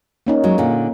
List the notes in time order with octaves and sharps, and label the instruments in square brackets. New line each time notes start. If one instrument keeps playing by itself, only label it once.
[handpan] A#3 C#4 D#4
[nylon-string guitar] F#3 G#3
A#2 D3